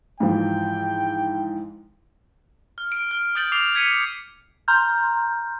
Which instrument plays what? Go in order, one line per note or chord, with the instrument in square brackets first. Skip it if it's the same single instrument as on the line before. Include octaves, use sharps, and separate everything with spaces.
[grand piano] G#2 E3 F3 [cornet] G5
[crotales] F6
D7
F6
D#6 F6 G6 A6 D7 F#7
D6 F6 C7 F7
G#6 B6 C#7 D#7
[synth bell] A#5 C6 F6 G6